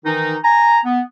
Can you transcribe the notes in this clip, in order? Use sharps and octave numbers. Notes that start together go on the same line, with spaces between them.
D#3 E3 D#4
G#5 A#5
B3